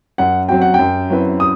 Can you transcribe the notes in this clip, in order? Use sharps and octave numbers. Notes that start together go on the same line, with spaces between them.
F#2 F#5
F#3 C4 F#4 G5
F#5
F#2 G5
F#3 C4 E4 B4
D#6